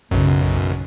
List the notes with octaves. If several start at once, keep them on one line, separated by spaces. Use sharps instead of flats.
B1 F#2 C#3